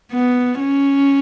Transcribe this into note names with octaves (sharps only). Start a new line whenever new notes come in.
B3
C#4